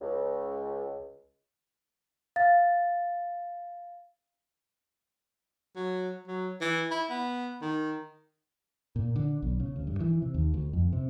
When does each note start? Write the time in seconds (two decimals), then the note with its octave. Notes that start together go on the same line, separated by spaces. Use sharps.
0.02 C#2
2.36 F5 A6
5.76 F#3
6.27 F#3
6.61 E3
6.91 E4
7.10 B3
7.61 D#3
8.96 A#2
9.16 D3
9.42 B1
9.60 C#3
9.76 D2
9.87 G2
10.00 E3
10.22 C3
10.34 D#2
10.54 D2
10.73 F2
10.93 C3